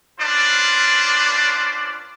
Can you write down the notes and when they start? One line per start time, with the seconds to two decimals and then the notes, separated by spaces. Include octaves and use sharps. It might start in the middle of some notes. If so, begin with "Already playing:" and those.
0.20 C#4 D4 F4 B4 C5 D5